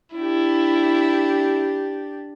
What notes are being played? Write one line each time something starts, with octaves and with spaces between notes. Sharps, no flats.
D4 E4 G4